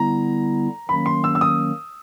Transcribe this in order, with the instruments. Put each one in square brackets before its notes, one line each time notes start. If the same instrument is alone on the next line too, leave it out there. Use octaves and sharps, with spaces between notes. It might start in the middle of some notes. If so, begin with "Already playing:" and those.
Already playing: [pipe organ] D3 G3 B3 E4 [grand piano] A#5
[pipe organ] D#3 F#3 A#3 C#4 [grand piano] B5
[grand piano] C6
E6
E6
D#6